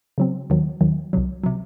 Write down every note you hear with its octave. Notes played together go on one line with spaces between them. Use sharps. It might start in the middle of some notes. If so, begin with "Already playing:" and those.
C#3 F#3 C4
D#2 D#3 F#3
D#2 D#3 F#3
C2 C3 F#3
C3 F#3